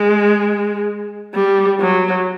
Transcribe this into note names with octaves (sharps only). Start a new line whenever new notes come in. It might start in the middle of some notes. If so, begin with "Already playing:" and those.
Already playing: G#3
G3
F#3